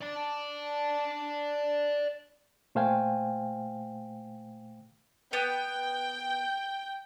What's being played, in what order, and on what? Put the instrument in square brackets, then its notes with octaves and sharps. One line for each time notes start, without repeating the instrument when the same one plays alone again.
[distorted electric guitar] D5 A5
[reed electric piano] A#2 A3 C5 F5 G5 G#5
[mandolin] B3 [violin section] G5